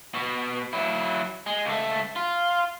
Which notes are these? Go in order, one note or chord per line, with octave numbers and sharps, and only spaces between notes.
B2
F#3 E4
G#3
C#2 A3
F4